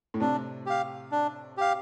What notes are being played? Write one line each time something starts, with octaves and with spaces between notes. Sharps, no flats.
A2
C3 D4
G4 F5
D4
G4 F5